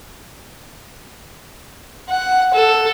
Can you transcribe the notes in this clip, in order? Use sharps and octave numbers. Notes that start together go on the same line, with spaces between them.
F#5
A4